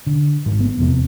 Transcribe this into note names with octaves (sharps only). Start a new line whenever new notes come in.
D3
G#1
B3
F1 E2 C3